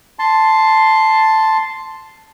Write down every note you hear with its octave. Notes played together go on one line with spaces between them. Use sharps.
A5 C6